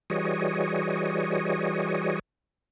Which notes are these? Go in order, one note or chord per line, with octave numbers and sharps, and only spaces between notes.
E3 G3 F#4 G#4 C#5 D#5